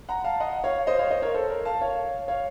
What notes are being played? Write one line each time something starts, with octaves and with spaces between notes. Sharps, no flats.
F#5 A#5
F5 A5
D#5 F#5
C#5 F5
C5 D#5
C#5 F5
C5 D#5
A#4 C#5
A4 C5
A#4
F5 A5
C#5 F5
C#5 F5